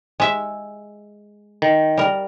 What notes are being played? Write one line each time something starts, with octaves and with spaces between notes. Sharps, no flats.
G#3 E5
D#3
G3 A#4